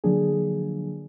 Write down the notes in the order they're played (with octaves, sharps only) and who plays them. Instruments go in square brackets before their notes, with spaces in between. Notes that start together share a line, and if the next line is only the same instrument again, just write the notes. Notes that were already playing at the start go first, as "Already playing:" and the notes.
[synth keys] D3 F3 F#3 A#3 D4 G#4